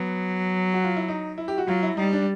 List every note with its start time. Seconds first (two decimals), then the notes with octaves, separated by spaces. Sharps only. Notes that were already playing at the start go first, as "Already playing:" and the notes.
Already playing: F#3 B3
0.74 F#4
0.84 F4
0.96 E4
1.08 D#4
1.38 E4
1.48 G4
1.58 F#4
1.67 F#3 F4
1.83 E4
1.97 G3 D#4
2.13 D4